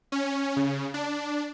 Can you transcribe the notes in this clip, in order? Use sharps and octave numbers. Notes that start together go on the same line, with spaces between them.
C#4
C#3
D4